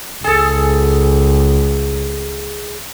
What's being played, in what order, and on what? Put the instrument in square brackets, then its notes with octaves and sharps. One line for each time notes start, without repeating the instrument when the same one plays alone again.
[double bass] C#2 [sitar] G#4 A4